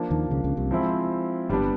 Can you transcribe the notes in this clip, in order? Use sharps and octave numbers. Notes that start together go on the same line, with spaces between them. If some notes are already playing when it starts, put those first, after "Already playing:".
Already playing: F3 A#3 D4
D#2 D#3
C#2 C#3
C#2 C#3
C2 C3
F3 G#3 C4 E4
G1 G2 G3 B3 D4